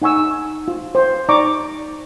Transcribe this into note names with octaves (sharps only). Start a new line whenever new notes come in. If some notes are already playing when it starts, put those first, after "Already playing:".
D#4 F#5 G#5 C#6 E6
F4
C5
D#4 D5 A#5 C#6 D6